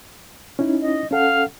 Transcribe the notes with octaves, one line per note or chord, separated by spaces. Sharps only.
C#4 D#4 E4
D#5
C#4 A4 F5 F#5